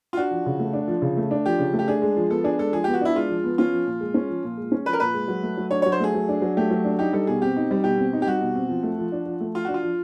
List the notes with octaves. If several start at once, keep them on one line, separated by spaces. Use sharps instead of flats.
F4
D4 F#4
F3
C#3
A3
D4
F3
C#3
A3
D4
F3 G4
C#3
A3
G4
D4 G#4
G#3
F3
B3 A4
D4 G#4
G#3 A4
F3 G#4
B3 G4
F#4
D4 E4
G#3 F4
F3
B3
C#4 F4
F3
A#2
G#3
C#4
F3
A#2
G#3
C#4
F3 B4
A#4
A#2 B4
G#3
F#3
A3
F#3
D4 C#5
F#3 C#5
C5
A3 G#4
F#3
D4
F#3
A3 G4
F#3
D4
D#4 G4
G3 A4
B2 G#4
C4 G4
D#4
G3
B2 G4
C4
D#4
G4
G3 F#4
B2
C4
F3
A3
F3
D4
F3
A3
F3 F4
D4 F#4
F4
F3